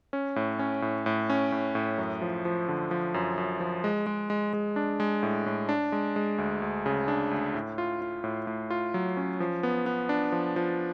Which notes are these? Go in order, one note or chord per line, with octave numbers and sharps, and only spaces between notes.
C#4
A2
C#4
A2
A2
C#4
A2
A2
F#2
F3
F3
D3
F3
F#2
F#2
F3
G#3
G#3
G#3
G#3
D4
G#3
A2
A2
D4
G#3
G#3
D2
D2
C#3
D4
D2
A2
F4
F4
A2
A2
F4
F#3
C#4
F3
B3
B3
D4
F3
F3